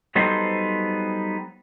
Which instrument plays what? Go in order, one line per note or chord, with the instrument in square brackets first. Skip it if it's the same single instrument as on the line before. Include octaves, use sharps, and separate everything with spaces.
[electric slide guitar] F#3 G3 B3 D#4 A4 C5